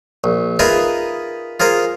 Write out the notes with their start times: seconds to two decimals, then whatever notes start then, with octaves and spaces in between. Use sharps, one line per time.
0.24 A#1
0.59 D#4 F4 G#4 A#4 B4 E5
1.60 F4 G#4 A#4 C5